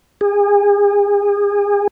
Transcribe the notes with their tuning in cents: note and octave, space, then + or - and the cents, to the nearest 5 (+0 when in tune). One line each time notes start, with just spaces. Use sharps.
G#4 -35